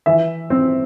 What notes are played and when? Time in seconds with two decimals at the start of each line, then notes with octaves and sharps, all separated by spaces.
0.06 E3 E5
0.50 C4